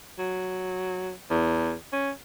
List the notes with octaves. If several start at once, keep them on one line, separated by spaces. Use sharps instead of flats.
F#3
E2
C#4